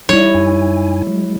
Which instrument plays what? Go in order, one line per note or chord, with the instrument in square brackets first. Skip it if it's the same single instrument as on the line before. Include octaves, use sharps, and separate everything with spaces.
[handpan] G3 E4 [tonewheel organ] D#4 D5 [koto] C#5
[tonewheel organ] F#2 D#4 G#5
F#3 G#3